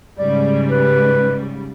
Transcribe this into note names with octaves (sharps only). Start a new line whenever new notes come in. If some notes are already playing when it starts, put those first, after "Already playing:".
G#2 C#3 G3 D5
B4